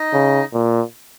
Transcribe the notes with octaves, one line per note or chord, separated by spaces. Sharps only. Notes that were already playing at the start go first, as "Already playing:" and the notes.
Already playing: D#4 D#5
C#3
A#2